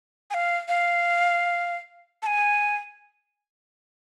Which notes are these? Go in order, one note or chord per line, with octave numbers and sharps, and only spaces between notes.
G#5
F5
F5
A5
G#5